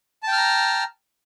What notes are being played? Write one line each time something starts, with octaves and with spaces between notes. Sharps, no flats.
G5 A5 A#5 F6